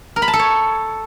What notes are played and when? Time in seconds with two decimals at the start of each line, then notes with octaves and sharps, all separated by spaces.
0.16 A#4
0.22 B5
0.28 A5
0.34 A4
0.39 C#5